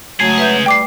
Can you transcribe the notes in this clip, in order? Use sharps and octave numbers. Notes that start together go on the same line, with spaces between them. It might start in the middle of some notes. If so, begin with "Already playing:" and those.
C#2 F#3 A3 G#4
B4 E5 G6
G3 G5 D6 C7